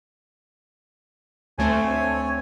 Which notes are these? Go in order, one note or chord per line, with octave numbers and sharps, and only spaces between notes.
D2 A3 C4 C#5 G#5